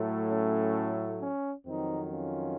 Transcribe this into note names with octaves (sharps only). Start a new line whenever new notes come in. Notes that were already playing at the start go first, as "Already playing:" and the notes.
Already playing: A2 F#3 A3
C#4
C#4
F2 D#3 F#3 C4 D#4
C#4 F4